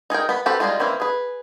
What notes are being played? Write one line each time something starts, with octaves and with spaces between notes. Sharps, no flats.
D#4 G#4 A#4 G5
B3 B5
C4 F#4 G4 A4 B4
G3 G#3 B3 D#4 F4
E3 A#3 C4 C#4
G#4 B4